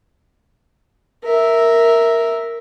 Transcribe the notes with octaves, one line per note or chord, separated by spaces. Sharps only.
A#4 E5